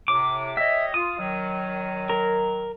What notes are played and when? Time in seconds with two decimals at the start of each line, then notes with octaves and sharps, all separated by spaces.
0.08 A2 C3 D6
0.57 G4 C#5 D#5 E5
0.94 F4 D#6
1.18 D#3 F#3
2.10 A#4